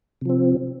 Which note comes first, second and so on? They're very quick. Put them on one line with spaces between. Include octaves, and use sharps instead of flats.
C3 F3 C4